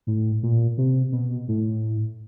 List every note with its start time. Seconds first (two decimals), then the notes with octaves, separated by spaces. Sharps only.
0.07 A2
0.43 A#2
0.78 C3
1.12 B2
1.48 A2